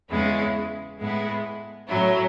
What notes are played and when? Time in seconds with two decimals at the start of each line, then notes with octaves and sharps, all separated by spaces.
0.10 E2 C#3 G#3 B3 E4
0.99 A2 G#3 B3 E4
1.88 A2 F#3 C#4 E4